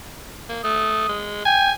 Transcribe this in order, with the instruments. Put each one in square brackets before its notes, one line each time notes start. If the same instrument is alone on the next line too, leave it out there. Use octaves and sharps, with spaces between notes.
[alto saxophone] A#3
[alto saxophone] A3 [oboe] D#6
[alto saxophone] G#3
[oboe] G5 [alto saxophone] G#5